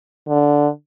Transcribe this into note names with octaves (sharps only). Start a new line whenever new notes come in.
D3